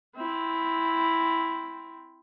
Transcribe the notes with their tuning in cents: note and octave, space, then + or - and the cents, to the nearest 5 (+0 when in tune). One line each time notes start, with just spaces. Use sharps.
C4 +0 E4 +0